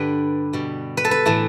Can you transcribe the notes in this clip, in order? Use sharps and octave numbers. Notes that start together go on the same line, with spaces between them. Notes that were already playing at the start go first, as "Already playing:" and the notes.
Already playing: G2 D3 G3 B4
B2 G3
B4
A4
B4
A2 E3 A3